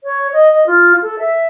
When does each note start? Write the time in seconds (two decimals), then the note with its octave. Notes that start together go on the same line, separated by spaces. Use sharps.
0.04 C#5
0.33 D#5
0.52 D#5
0.67 F4
1.02 A4
1.19 E5